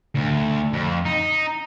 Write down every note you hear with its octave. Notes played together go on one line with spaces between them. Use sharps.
D2
F2
D#4